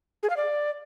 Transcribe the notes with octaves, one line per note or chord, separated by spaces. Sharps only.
G#4
F5
D5